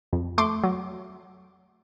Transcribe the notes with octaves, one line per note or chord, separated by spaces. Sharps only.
F2
A3 C6 D6
F#3